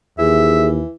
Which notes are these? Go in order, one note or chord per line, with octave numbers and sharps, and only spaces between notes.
D#2 E3 G#4 E5